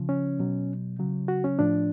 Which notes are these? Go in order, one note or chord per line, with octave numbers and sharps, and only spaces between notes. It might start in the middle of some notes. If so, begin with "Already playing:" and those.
Already playing: C#3 F3
C#4
B2 F#3
C#3 F#3
F#4
C#4
A2 F3 D4